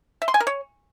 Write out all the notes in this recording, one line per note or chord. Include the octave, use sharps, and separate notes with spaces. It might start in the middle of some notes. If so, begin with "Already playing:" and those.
E5
C6
G#5
A#4
C#5